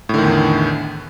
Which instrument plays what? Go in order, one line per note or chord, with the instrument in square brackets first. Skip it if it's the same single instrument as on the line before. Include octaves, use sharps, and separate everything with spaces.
[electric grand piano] A2
D3
D#3
E2